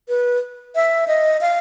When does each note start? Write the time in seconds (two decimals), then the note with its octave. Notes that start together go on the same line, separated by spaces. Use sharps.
0.09 B4
0.75 E5
1.08 D#5
1.41 F5